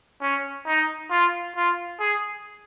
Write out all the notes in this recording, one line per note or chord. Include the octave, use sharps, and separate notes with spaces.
C#4
D#4
F4
F4
G#4